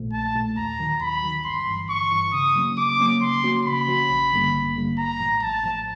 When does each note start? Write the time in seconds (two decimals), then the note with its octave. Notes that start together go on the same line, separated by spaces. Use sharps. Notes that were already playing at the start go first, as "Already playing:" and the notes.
Already playing: A#1 A#2 F3 A3
0.13 A#1 A5
0.35 A#2 F3 A3
0.57 D#2 A#5
0.79 D#3 F#3
1.01 D#2 B5
1.22 D#3 F#3
1.45 G1 C6
1.67 G2 E3
1.89 G1 C#6
2.11 G2 E3
2.33 C#3 D#6
2.55 F#3 A#3 C#4
2.77 C#3 D6
3.00 F#3 A#3 C#4
3.21 C#3 C6
3.43 F3 A#3 C#4 F#4
3.65 C#3 B5
3.87 F3 A#3 C#4 F#4
4.09 A1
4.32 G2 D3 G3 A#3
4.53 A1
4.76 G2 D3 G3 A#3
4.98 A1 A#5
5.20 A2 F3
5.42 A1 A5
5.63 A2 F3